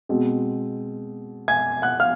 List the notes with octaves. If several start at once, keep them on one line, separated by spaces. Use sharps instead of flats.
B2 G#3 C4
G#5 G#6
F#5 F#6
F5 F6